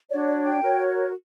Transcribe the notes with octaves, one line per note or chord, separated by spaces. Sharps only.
D4 F#4 C#5 D5
D5
G5
F#4 A#4 C#5